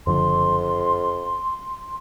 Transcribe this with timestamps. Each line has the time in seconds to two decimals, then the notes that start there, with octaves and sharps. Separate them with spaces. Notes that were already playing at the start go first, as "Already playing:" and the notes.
0.07 F#1 F2 D3 F3 C6